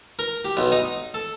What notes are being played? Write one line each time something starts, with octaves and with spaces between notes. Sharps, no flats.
A#4
G4
B1
D#4
D#6
A4